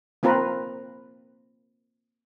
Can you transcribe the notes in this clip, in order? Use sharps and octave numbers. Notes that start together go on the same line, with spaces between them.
A#3 C4 F4 A#4 B4